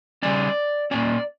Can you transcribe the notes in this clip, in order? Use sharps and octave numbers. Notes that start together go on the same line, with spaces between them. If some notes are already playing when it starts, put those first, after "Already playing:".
C#3 G3 C#4 D5
A#2 A#3 C#4 D5